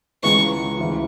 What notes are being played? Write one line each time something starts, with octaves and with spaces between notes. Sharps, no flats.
C#2 C#3 E3 G#3 B3 C#6
D2 C#3 E3